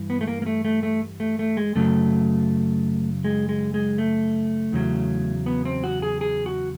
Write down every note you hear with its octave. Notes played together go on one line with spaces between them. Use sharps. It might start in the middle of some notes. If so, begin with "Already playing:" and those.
Already playing: G2 E3
B3
A3
A#3
A#3
A3
A3
A3
A3
A3
G#3
F#2 C#3 F#3 A3
G#3
G#3
G#3
A3
E2 C#3 F#3
B3
C4
F#4
G#4
G#4
F#4